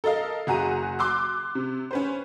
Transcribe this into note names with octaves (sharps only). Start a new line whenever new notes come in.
A4 A#4 D#5 F5
F#1 F#4 G#4 A#5 D#7
C6 D6 E6 F#6
C3
C#4 B4 C5